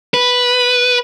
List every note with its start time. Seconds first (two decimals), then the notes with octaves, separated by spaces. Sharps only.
0.14 B4